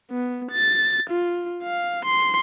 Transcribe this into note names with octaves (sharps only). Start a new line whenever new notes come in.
B3
A6
F4
F5
C6